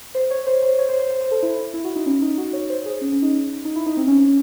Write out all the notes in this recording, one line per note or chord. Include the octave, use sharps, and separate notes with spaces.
C5
C#5
C5
C5
C#5
C5
C5
C5
C5
A4
E4
E4
F#4
D#4
C#4
D#4
F#4
C#5
C5
G#4
C#4
C#4
D#4
D#4
E4
D#4
C4
C#4
C#4